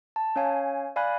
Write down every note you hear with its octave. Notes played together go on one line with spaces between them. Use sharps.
A5
C#4 C#5 F5 G#5
D5 F5 G#5 B5 F#6